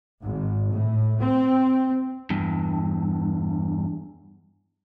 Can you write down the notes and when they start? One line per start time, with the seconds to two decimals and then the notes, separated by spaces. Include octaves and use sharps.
0.21 G#1
0.71 A2
1.18 C4
2.30 E2 G2